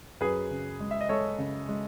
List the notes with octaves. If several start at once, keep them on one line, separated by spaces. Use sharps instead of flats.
F#2 G#4 B4
C#3
G#3
E5
D#5
G#3 A4 C#5
C#3
G#3